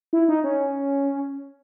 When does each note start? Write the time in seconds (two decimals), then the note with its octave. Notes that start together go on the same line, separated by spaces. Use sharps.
0.13 E4
0.28 D#4
0.44 C#4